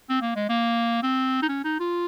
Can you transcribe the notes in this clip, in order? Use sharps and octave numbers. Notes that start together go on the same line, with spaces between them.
C4
A#3
G#3
A#3
C4
D#4
C#4
D#4
F4